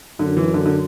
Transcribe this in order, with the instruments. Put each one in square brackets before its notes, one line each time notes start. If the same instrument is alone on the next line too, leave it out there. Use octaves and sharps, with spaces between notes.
[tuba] F#2 [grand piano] D3
[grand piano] E3
D3
D3